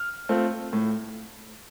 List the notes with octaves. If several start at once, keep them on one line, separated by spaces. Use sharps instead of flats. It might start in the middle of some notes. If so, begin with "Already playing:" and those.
Already playing: F6
A3 C4 F4
A2